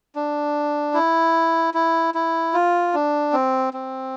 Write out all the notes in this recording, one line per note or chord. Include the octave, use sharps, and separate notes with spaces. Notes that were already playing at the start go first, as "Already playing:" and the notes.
D4
E4
E4
E4
F4
D4
C4
C4